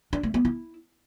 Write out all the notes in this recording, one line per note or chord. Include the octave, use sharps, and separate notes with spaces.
D4
A3
B3
E4